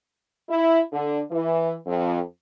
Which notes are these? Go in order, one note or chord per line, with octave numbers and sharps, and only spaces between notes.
E4
D3
E3
F2